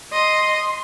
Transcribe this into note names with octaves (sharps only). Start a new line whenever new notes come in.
D#5 C6